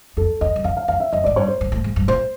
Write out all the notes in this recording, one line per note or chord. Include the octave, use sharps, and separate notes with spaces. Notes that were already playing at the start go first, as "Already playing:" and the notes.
F2 A4
E2 D#5
F#2
F2 F5
F5
F2 F5
E5
F#2 D#5
G#2 D5
G2 C#5
C5
G#2
A2
G#2
G2
A#2 C5